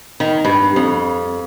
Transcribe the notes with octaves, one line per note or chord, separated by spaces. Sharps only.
D#3
G2
F2